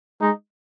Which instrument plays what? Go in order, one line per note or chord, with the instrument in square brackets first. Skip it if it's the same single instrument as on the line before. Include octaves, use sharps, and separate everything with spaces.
[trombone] G#3 [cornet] D#4